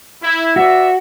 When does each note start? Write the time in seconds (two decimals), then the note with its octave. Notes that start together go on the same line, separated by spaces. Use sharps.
0.23 E4
0.56 F#4 B4 D5 E5